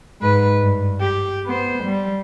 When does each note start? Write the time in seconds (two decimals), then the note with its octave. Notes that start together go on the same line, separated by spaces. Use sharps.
0.21 G#2 B4
0.61 G2
1.01 G4
1.46 B3 C5
1.84 G3